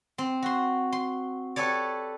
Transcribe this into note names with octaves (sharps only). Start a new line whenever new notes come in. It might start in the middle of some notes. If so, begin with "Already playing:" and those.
C4
F#4 C6
C6
G4 A4 B4 C#5 D5